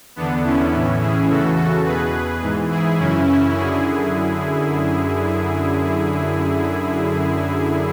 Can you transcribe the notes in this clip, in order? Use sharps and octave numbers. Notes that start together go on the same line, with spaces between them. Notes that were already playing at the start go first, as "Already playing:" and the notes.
E2 D3 B3 D4
C#4 E4
A2 E3
E4 G#4
E2 C#3 E3 F#4 A4
F#4 A4
E2 B2 G#4 B4
G#2 E3
E4 G#4
F#2 C#3 E3 C#4 E4
C#4 E4
F#2 D3 E4 G#4